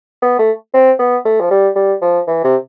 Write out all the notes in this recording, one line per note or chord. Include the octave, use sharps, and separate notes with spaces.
B3
A3
C4
B3
A3
F3
G3
G3
F3
E3
C3